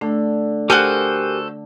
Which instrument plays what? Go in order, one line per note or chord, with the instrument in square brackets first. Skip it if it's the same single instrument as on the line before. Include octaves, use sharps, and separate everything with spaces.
[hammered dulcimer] D3 [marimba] A3 D4
[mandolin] F#4 A4 C5 [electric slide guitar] G4 A#4 G#5